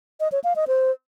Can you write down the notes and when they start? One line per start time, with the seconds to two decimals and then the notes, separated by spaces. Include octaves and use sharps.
0.20 D#5
0.32 C#5
0.44 F5
0.56 D#5
0.68 C5